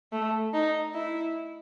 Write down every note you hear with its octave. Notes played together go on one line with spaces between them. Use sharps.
A3
D#4
E4